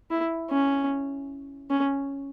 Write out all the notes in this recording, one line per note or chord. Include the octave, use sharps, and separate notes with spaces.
E4
C#4
C#4